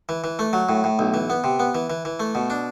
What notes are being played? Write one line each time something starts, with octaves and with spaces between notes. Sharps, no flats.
E3
E3
A3
F#3
A2
A2
B1
E3
B3
C3
B3
E3
E3
E3
A3
B2
D4